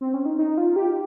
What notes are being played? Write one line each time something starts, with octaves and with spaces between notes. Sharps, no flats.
C4
C#4
D#4
D#4
F4
G4